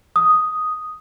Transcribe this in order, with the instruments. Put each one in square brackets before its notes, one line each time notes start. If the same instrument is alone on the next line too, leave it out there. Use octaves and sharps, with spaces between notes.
[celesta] D#6